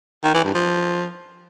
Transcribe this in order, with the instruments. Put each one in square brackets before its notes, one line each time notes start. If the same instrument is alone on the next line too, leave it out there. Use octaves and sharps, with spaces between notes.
[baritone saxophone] D#3
E3
G2
F3